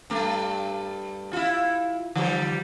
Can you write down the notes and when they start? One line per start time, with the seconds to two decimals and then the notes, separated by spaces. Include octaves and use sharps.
0.10 G2 A3
1.33 E4 F4
2.16 D3 F3 G3